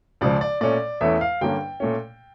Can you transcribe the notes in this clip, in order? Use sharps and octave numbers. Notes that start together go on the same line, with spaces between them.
C#2 C#3 F3 D5
D5
A#2 A3 C#4 D5
E2 E3 A3 C#4 E5
F5
G2 D3 G3 A#3 C#4 G5
A#2 A3 C#4